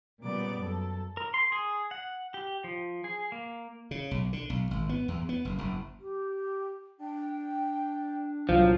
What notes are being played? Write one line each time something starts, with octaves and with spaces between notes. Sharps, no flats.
A#2 C#3 G3 B3 D5 D6
F#2 A4
A#4
C6
G#4
F#5
G4
F3
G#4
A#3
C#3
B1
D3
B1
G#1
B3
E2
B3
F#1
F#1
G4
D4 G5
C2 A#2 F3 F#3 F5